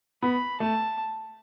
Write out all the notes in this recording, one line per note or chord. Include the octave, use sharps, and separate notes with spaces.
B3 B5
A3 A5